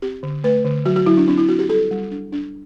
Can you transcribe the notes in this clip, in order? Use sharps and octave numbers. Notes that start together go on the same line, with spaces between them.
C4 G4
D3
A3 B4
D3
F#3 F#4
F#4
F#3 E4
D4
C4 D4
E4
C4 F#4
G4
G3 A4
G3
D4
D4